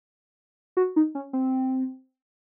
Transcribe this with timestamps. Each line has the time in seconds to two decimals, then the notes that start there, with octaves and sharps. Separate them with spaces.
0.77 F#4
0.96 D#4
1.15 C#4
1.33 C4